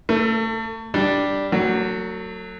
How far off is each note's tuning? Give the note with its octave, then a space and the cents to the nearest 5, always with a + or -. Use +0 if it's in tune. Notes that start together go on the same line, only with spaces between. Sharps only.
A3 +35 A4 +10
G3 +0 D4 +0
F#3 +0 A3 +40